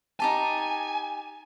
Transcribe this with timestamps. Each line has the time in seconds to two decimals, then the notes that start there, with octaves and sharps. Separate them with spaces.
0.20 D#4 G4 G#5 A5